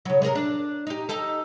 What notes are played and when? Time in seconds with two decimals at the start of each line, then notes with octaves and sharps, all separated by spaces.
0.05 C#3 F#3
0.22 C3 G#4 A#4
0.35 D4
0.87 D#4 G4
1.09 D#4 G4 A4